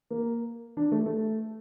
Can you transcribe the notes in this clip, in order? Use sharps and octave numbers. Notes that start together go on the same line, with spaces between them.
A#3
D4
A3
A3